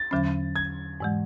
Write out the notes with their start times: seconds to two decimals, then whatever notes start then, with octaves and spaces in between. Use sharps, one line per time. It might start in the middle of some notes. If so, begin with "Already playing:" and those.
Already playing: A6
0.11 E2 D3 F#3 C#4
0.56 G#6
1.00 G#2 E3 G#3